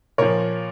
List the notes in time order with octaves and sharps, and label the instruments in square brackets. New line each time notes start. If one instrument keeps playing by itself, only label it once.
[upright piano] A#2 F3 A#4 C#5